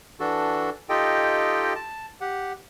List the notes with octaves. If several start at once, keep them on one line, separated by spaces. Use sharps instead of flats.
E3 D4 F#4 A4
D#4 F4 G4 A4 D#5 G5
A5
G4 F#5